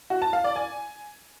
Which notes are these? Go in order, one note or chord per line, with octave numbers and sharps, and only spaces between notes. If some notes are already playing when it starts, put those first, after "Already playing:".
F#4
A5
F5
D5
G#5